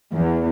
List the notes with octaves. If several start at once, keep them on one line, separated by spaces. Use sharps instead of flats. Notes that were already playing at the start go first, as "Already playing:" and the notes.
E2